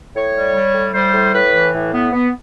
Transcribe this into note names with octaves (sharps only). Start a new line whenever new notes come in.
A2 C#5
G3
G3
A2
G3 C5
A2
A2 B4
E3
A2
B3
B3